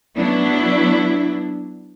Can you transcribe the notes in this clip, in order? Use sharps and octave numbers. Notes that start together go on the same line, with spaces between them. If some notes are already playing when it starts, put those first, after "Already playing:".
F#3 B3 D4 E4